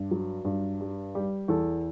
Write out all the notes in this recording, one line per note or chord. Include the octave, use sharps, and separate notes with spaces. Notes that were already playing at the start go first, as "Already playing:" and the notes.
Already playing: G2
F#3
G2
G3
G3
E2 A4